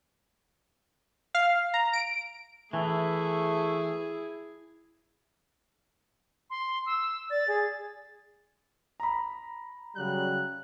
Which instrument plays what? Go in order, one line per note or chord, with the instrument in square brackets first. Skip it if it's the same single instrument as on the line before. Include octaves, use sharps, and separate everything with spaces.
[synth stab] F5
A#5
D7
[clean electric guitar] E3 [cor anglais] A3 [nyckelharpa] E4 G#4
[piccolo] C6
E6
[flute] D5 [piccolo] A6
[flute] G#4
[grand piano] A#5 B5
[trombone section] C#3 F#3 G3 [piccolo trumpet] F#6